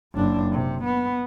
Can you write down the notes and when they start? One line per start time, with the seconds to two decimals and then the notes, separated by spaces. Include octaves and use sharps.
0.14 F#1 D4
0.52 C3
0.84 B3